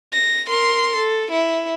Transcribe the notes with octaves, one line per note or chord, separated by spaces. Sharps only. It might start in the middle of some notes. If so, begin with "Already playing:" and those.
A#6
A#4 C6
A4
E4